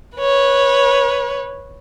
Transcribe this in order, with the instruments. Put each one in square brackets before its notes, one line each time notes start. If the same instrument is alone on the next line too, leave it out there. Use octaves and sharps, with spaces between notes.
[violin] B4 C#5